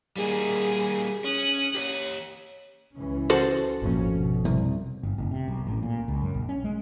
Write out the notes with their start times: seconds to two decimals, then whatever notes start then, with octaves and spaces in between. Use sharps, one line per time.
0.17 G3 A#3 D#4 G#4
1.24 C#4 D#6 F#6
1.75 G4 C5 C#5
2.95 C#2 E3 C#4
3.30 F#4 A4 C5
3.82 G#1 F2 A#2 C#4
4.12 B2
4.45 C2
5.03 G1
5.18 F#1
5.31 C3
5.48 B1
5.67 A1
5.83 A#2
6.08 C#2
6.22 F#2
6.34 A#1
6.49 C#4
6.64 G#3